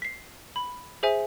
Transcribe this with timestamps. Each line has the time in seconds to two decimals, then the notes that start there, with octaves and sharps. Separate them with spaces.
0.02 B6 C7
0.56 B5
1.03 G#4 C5 E5 G#5